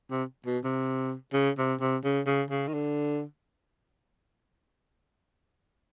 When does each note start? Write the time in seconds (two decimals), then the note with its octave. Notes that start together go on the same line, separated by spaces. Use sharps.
0.11 C3
0.46 B2
0.64 C3
1.33 C#3
1.58 C3
1.81 C3
2.04 C#3
2.26 C#3
2.50 C#3
2.68 D#3
2.73 D3